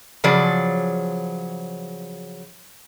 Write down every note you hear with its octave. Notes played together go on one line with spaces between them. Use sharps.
C#3 F3 F#3 G#4 D5